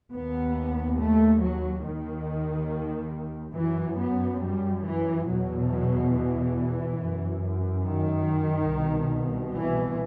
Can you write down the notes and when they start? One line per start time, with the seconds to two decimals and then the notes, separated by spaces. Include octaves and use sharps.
0.13 D#2 B3
0.99 A3
1.41 F#3
1.84 D#2 D#3
3.55 F#2 E3
3.98 B3
4.41 G3
4.85 E3
5.27 E2 B2 F#3
5.70 F#3
6.12 E3
6.98 F#2
7.84 D#3
8.69 C2 B2
9.55 E3